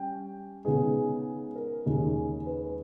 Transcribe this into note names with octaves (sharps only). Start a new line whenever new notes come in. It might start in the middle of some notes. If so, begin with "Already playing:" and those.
Already playing: G3 C#4 G5
C#3 G#3 B3 D#4 G#4
A#4
D#2 C#3 G#3 D#4
B4